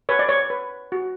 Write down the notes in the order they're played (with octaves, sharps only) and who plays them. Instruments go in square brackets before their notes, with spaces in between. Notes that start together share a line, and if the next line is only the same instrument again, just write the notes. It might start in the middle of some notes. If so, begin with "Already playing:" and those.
[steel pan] B4 C#5
D5
C#5
B4
F#4